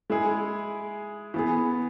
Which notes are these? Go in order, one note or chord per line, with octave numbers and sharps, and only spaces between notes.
G#3 E4 G#4
E3 B3 G#4